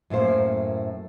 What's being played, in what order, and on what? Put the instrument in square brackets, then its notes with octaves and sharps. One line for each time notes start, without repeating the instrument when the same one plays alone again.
[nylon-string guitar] F#2 A2 A#3 C5